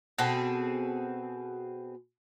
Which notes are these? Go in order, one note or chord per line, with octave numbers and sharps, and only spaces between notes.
B2 C4 G#4 A4